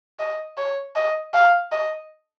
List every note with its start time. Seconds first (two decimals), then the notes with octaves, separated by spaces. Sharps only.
0.20 D#5
0.57 C#5
0.96 D#5
1.34 F5
1.72 D#5